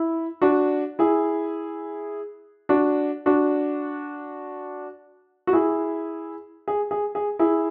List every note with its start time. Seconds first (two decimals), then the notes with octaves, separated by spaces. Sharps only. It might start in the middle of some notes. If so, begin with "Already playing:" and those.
Already playing: E4
0.42 D4 F#4
0.99 E4 G#4
2.69 D4 F#4
3.26 D4 F#4
5.47 F#4
5.53 E4 G#4
6.68 G#4
6.91 G#4
7.15 G#4
7.39 E4 G#4